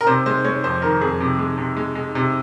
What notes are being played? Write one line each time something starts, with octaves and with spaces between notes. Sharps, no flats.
A#4
C3 C5
G#3 C5
G#3 C#5
F2 C5
D#3 A#4
F2 G#4
C3
G#3
C3
G#3
G#3
C3